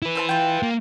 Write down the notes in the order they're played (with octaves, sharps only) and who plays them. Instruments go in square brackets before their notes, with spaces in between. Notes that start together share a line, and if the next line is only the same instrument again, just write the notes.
[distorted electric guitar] E4 B4
[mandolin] C5 E5 A5
F4 G5
[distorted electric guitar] A#3